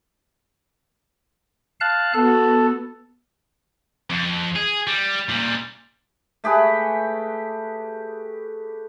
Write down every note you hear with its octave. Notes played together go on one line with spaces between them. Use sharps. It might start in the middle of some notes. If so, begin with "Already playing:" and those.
F5 A5 F#6
B3 F#4 A4
F2
G#4
G3
A#2 G3
A3 G4 G#4 B4